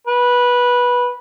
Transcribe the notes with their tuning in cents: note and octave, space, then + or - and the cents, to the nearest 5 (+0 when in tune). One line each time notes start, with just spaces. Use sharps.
B4 -15